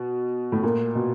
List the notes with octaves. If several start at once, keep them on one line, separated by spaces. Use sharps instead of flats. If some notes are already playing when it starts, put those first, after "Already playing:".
Already playing: B2
A2
A#2
B2